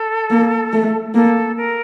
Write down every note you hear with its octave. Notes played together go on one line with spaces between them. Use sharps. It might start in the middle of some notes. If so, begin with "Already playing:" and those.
Already playing: A4
A#3
A3
A#3 A4
A#4